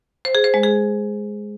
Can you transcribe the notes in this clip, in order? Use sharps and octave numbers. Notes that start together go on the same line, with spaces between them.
C5
G#4
C5
G#3
G#4